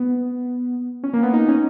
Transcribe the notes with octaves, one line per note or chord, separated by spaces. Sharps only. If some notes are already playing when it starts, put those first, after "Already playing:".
Already playing: B3
C#4
A#3
B3
D#4
C#4